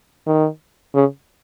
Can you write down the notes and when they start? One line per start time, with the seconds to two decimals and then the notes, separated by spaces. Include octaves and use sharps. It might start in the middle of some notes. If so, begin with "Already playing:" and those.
0.27 D#3
0.94 C#3